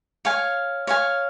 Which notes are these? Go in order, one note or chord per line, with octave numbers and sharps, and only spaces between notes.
C#5 F5 G#5
C#5 F5 G#5